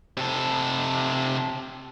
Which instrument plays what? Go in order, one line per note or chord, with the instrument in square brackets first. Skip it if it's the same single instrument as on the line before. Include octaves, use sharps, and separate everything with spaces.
[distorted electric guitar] C3 A4